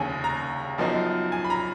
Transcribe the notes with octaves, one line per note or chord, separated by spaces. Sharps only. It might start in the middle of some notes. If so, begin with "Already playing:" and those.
Already playing: F1 D#2 C#3 G#5
A#5
F#2 F3 B3 D#4
G#5
B5
A#5